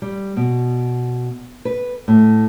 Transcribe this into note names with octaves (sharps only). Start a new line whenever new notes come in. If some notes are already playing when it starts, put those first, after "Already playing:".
G3
B2
B4
A2